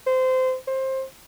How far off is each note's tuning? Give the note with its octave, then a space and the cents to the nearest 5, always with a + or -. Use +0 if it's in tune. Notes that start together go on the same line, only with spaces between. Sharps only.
C5 -20
C5 +20